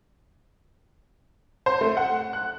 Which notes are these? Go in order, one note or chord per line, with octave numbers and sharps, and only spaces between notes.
C5
A3
F#5
F#6